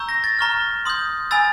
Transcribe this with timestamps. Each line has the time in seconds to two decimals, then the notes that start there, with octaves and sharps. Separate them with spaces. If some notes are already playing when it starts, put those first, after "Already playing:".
Already playing: A#5 C#6 E6 G6
0.09 A#6
0.24 A6
0.39 A#5 C#6 F6
0.85 C6 D#6 G6
1.31 G#5 B5 E6 A6